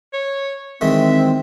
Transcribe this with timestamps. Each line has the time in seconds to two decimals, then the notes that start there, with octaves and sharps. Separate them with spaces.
0.13 C#5
0.81 D#3 E3 G#3 C4 E5